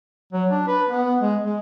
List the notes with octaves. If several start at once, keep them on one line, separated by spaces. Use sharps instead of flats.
F#3
D4
B4
B3
G#3
G#3